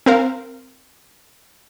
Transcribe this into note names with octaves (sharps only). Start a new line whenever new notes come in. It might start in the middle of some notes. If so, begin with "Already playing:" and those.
C4 A#4 F5